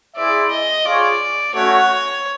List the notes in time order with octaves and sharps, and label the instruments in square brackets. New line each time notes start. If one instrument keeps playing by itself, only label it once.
[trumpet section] E4 G#4 C5 E5 [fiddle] D5
[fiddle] D#5
[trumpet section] F4 G#4 C#5 [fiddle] D5
[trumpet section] A3 C#4 F#4 [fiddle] C#5